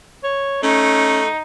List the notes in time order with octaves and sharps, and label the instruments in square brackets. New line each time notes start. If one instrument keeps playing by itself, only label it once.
[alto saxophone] C#5
[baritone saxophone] A3 [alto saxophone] C#4 [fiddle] D#4